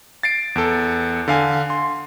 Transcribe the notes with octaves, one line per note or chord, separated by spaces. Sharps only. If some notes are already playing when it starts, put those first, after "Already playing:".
A6 C7 D7
E2 A4
D3 F5 G#5
C6